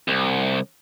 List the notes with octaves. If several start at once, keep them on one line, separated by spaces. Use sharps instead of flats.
C2